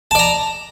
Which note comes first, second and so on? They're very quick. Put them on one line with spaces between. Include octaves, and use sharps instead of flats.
A5 D5 A#5